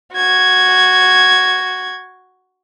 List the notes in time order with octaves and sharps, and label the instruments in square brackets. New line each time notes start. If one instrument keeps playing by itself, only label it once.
[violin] F#4 G#6